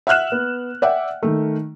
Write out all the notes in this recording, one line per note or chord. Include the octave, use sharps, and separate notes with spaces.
E5 F#5 F6 F#6 E7
B3
D5 E5 F#5 G5
D#3 A3